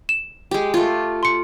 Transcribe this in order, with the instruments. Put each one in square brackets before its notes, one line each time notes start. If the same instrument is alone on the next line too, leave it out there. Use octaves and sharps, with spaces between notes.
[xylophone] E7
[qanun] G#3 G4
A3 F4
[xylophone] C6 C#7